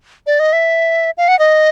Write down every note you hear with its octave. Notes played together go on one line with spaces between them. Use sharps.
D5
D#5
E5
F5
F#5
D#5